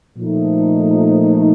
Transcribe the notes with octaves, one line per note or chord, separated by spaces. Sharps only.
A#2 F3 A3 D#4